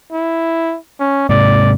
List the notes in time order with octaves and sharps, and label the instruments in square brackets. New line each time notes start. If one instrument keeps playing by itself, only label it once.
[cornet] E4
C#4
[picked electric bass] G#2 C3 [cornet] D5